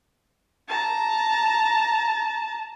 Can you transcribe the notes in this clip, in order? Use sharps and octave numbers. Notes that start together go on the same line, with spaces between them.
A5 A#5